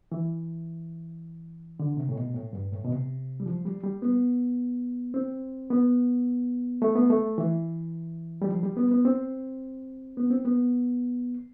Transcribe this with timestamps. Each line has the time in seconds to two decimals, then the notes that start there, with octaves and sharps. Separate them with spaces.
0.12 E3
1.79 D3
1.97 C3
2.09 A2
2.16 B2
2.34 A2
2.53 G2
2.72 A2
2.85 B2
2.90 C3
3.40 G3
3.46 F3
3.65 G3
3.83 G3
4.02 B3
5.14 C4
5.70 B3
6.82 A3
6.95 B3
7.10 A3
7.38 E3
8.42 G3
8.49 F3
8.63 G3
8.77 B3
8.91 B3
9.05 C4
10.17 B3
10.30 C4
10.45 B3